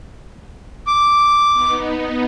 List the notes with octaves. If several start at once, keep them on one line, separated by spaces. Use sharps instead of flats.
D6
B3 D#4